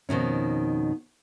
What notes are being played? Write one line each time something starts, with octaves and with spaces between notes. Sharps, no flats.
F2 B2 D#3 C#4